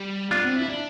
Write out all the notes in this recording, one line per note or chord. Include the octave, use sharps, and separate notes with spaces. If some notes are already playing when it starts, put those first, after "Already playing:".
Already playing: G3
B3 D4 F4
C4
E4
D4